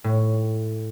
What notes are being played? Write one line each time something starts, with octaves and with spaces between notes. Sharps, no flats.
A2